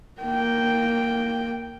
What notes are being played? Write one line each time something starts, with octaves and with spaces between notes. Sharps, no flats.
A#3 G5